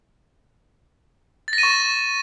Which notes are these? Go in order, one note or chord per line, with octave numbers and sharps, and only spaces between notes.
A6
A#6
D#7
C#6